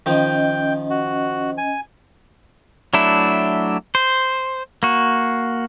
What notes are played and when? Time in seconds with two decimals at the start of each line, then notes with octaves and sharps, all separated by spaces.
0.06 D#3 F3 C#4 D#5 G5
0.90 F#4
1.58 G#5
2.94 F#3 A3 D4 E4
3.95 C5
4.83 A#3 F#4